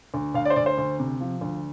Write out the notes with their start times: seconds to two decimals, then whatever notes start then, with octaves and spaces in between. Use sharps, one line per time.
0.14 D2
0.34 D2 F5
0.45 D5
0.50 C5
0.56 D2 D5
0.66 C5
0.78 D2
0.99 C3
1.21 F3
1.41 D2